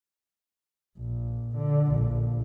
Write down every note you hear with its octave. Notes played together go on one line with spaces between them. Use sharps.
A#1
D3
A#1